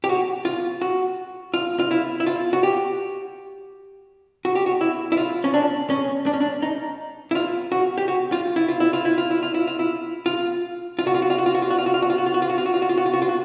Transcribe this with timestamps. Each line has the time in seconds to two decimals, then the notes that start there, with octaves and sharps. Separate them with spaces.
0.04 G4
0.09 F#4
0.45 F4
0.82 F#4
1.54 F4
1.79 F4
1.91 E4
2.20 E4
2.27 F4
2.53 F#4
2.63 G4
4.45 F#4
4.55 G4
4.66 F#4
4.81 E4
5.12 E4
5.17 F4
5.44 C#4
5.54 D4
5.90 C#4
6.26 D4
6.33 C#4
6.40 D4
6.62 D#4
7.31 E4
7.35 F4
7.72 F#4
7.98 G4
8.08 F#4
8.32 F4
8.56 E4
8.69 F4
8.80 E4
8.93 F4
9.05 E4
9.18 F4
9.30 E4
9.43 F4
9.54 E4
9.67 F4
9.79 E4
10.26 F4
10.99 F4
11.07 F#4
11.14 F4
11.22 F#4
11.30 F4
11.38 F#4
11.46 F4
11.55 F#4
11.62 F4
11.71 F#4
11.78 F4
11.86 F#4
11.94 F4
12.02 F#4
12.10 F4
12.18 F#4
12.26 F4
12.34 F#4
12.42 F4
12.50 F#4
12.58 F4
12.66 F#4
12.74 F4
12.82 F#4
12.89 F4
12.98 F#4
13.06 F4
13.14 F#4
13.22 F4
13.29 F#4